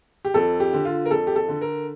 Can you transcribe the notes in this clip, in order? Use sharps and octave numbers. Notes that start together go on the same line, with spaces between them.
G4
F2 A4
G4
D3
F4
A#4
F2 A4
G4
A4
D3
A#4